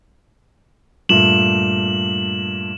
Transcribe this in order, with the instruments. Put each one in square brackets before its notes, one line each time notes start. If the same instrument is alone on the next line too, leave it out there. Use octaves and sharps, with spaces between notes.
[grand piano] G2 A#2 A3 [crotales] E7 F#7